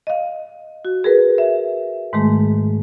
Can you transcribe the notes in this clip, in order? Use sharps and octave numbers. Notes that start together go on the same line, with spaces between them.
D#5 F5
F#4
G#4 A#4 B4
E5
G#2 D#3 G#3 A3